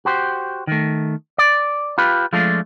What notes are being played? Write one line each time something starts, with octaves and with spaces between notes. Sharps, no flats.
F#4 G4 C5
D#3 A3
D5
F4 G4 B4
F3 G#3 A3 D4 F4 A4